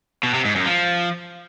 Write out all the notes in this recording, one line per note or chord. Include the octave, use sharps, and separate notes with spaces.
B2
C3
G#2
F#2
F3